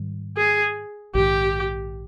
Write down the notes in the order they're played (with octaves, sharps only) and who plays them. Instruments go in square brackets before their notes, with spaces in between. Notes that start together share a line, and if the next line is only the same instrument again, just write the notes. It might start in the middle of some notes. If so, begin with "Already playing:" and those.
Already playing: [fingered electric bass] G#2 D#3 G3
[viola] G#4
[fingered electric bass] A#1 G#2 D#3 [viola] G4